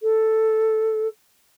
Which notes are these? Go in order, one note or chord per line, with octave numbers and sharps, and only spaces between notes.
A4